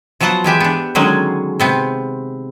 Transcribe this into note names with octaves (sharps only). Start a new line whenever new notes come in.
F3 F#3 B3 F4 F#5
E3 G#3 G4 E5
B3 D4
D3 D#3 F#3 G#3 C#4 G#4
C3 B3 C4